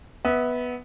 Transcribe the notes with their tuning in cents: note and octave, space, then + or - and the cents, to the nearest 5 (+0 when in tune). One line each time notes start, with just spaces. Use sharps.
B3 +0 E5 -30